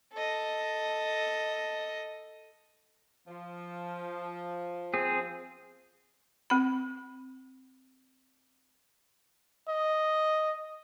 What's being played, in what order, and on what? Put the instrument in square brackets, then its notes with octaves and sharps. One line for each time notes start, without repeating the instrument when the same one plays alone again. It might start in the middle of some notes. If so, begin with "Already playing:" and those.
[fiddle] A4 D#5
[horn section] F3
[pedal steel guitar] C4 G#4
[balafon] C4 B5
[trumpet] D#5